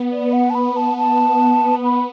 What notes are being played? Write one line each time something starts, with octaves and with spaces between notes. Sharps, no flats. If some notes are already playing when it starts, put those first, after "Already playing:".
Already playing: B3
D5
F#5
A5
B5
A5
A5
B5